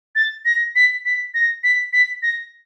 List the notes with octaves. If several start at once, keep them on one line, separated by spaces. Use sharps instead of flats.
A6
A#6
B6
B6
A#6
B6
B6
A#6